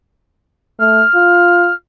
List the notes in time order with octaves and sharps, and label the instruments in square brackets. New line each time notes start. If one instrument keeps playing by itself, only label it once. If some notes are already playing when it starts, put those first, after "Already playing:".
[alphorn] A3 [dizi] F6
[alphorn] F4